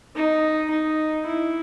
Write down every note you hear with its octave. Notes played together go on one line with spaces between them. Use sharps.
D#4
D#4
E4